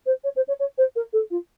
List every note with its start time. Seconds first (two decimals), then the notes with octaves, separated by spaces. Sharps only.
0.05 C5
0.23 C#5
0.35 C5
0.47 C#5
0.59 C#5
0.77 C5
0.95 A#4
1.12 A4
1.30 F4